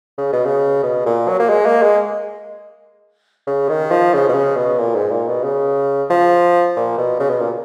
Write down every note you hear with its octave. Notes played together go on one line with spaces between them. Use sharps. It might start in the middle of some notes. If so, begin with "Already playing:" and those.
C#3
B2
C#3
B2
A#2
F#3
A#3
G#3
A#3
G#3
C#3
D#3
F3
C#3
B2
C#3
B2
A#2
G#2
A#2
B2
C#3
F3
A#2
B2
C#3
B2
A#2